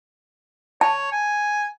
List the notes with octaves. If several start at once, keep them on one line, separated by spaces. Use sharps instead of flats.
C#5 A5
G#5